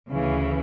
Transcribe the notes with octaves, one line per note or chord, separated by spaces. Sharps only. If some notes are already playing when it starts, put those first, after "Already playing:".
D2 C#3 E3